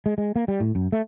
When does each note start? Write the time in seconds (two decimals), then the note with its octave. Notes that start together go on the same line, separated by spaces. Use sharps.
0.06 G#3
0.18 G#3
0.36 A#3
0.48 G3
0.60 A2
0.75 F#2
0.92 A3